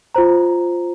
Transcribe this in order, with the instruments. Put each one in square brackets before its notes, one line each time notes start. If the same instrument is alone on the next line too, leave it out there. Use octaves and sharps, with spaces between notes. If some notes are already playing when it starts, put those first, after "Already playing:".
[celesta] F4 C5 A#5